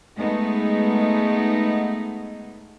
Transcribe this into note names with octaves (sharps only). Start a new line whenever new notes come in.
G#3 A3 B3 D#4